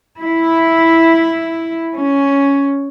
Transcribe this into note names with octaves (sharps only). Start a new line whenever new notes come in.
E4
C#4